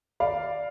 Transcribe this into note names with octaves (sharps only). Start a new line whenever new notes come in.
D5 F5